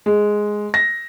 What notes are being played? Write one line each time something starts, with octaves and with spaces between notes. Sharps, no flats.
G#3
A#6